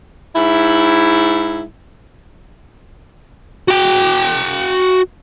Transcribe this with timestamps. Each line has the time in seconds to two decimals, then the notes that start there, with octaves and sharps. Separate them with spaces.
0.36 G#2 E4
3.68 F#4 G5